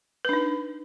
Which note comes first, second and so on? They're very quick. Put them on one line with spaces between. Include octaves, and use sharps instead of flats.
B4 D4 D#4